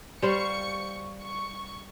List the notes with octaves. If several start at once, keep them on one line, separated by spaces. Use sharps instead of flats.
G3 C5 F5 C#6 C#7
C#6